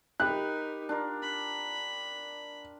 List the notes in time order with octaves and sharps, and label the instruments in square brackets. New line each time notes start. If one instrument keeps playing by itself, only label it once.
[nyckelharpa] D#4 A#4 [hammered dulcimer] G4 B5 [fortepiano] F#6
[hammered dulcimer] D4 F4 A#4
[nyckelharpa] B5